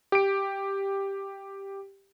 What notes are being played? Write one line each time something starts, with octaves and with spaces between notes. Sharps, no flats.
G4 D7